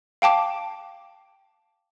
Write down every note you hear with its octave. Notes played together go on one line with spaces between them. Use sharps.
F5 G5 A5 D6